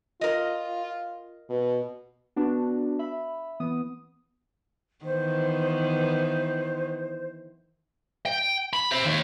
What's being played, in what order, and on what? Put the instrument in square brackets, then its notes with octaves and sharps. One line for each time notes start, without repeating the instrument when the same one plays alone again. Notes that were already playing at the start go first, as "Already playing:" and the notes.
[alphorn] F4 [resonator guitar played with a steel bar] A#4 D#5
[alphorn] B2
[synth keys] B3 D4 F#4
E5 B5
E3 B3 D#6
[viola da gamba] D#3 E3 B3 [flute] C5
[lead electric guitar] G5
B5
C5 E5
D#2